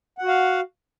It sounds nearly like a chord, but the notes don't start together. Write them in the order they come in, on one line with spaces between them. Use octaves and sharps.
F#5 F#4 F5